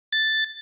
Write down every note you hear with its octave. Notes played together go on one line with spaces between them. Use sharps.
A6